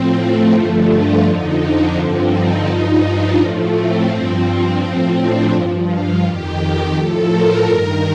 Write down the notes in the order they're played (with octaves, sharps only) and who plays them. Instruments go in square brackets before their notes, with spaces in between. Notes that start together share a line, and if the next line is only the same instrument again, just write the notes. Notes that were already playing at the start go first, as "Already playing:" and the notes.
Already playing: [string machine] A2 F3 C4
A3
G2 D3 F3 A3
F4
F2 D3 F3 D#4
D4
G2 D3 F3 C4
D#4
G2 F3
D4
A2 F3 A3
C4
G2 F3
A2 F3
D4
G2 F3
F4
F2 D#3 G4
A2 F3 A4
A#4
G2 D#3